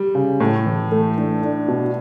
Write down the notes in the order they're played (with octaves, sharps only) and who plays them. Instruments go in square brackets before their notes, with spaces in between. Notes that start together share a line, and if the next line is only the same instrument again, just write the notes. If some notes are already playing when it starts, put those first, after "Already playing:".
Already playing: [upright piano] G3
[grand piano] C#3
[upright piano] A2 [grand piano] A3
[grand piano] E3
A3
D4
D4
B2